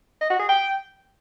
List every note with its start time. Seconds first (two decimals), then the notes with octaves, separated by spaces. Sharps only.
0.21 D#5
0.30 F#4
0.39 G#4
0.48 G5